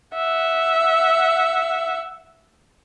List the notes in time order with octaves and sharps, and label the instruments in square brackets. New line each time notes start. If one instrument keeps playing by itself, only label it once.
[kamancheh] E5 F#5